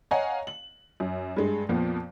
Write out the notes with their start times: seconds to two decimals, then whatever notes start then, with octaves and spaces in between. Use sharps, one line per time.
0.11 C#5 D#5 F5 F#5 G#5 A#5
0.47 F#7
1.00 F#2
1.36 G2 G#3
1.69 F2 A#2 F3 B3